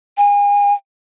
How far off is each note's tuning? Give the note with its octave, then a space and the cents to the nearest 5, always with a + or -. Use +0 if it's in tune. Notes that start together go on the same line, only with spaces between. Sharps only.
G#5 -35